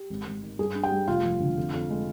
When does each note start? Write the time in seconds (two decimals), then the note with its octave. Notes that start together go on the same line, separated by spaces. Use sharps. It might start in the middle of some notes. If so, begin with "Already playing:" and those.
Already playing: G4
0.10 G#1
0.27 G#1
0.43 D#3
0.59 G2 G#4
0.75 D4
0.83 G4 G5
0.92 G3
1.08 F1 F4 F5
1.24 F3
1.40 D3
1.57 F2
1.74 F2
1.90 G#3